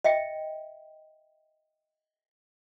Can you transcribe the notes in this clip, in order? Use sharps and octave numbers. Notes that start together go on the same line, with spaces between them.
D#5 E5 G5